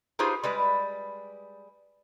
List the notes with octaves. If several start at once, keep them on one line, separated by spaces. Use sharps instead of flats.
D#4 F4 G4 G#4 B4 C5
G3 G#3 B4